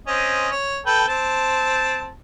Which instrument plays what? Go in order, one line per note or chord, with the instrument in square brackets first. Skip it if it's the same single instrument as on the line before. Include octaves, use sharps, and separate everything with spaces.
[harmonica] C4 C#4 D#5
C#5
A4 B4 G5
C4 A5